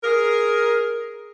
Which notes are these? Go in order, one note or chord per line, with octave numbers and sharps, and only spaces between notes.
G#4 A#4